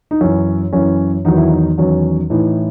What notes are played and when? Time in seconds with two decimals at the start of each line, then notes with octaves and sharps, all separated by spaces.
0.11 D#4
0.21 F#2 E3 C#4
0.73 F#2 E3 C#4
1.25 E2 D#3 F#3 D#4
1.36 E4
1.49 D#4
1.77 E2 D#3 F#3 C#4
2.30 A2 E3 D#4